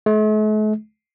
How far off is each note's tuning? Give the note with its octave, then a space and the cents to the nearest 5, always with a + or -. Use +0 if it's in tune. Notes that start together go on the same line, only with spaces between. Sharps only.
A3 -45